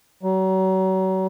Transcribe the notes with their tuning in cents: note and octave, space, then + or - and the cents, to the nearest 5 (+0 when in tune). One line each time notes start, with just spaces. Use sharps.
F#3 +35